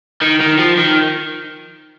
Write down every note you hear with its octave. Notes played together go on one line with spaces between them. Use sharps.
D#3
D#3
F3
D#3